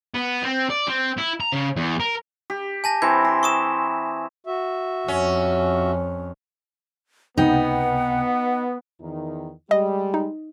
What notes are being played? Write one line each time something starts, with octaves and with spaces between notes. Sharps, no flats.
B3
C4
D5
C4
E4
A#5
C#3
E2
A#4
G4
G#5 A5 A#6
E3 C4 G#6
C6
C#6 D#6 E7
F#4 E5
F2 C#4
C#2 C3 B3 D#4 F#5 G5
E2 D#3 D#4
G3 G#3 G4 D#5
D#4